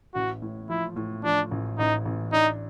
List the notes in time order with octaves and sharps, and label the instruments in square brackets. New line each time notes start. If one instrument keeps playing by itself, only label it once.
[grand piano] A1 [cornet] F#4
[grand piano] A2
[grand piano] F3 [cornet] E4
[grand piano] A2
[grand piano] F3 [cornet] D4
[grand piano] A1
[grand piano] A1 [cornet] D#4
[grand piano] A1
[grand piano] D4 [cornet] D#4